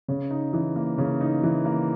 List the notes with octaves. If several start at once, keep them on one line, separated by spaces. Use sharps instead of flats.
C#3
D#4
E3
A#3
C#3
D#4
E3
A#3